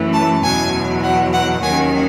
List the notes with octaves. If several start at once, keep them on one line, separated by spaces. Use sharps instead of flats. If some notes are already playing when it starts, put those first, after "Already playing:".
Already playing: F#2 E3 A3 C#4
A5
E2 B2 F#3 G#5
F#5
F#5
D#2 D#3 F#3 C#4 G#5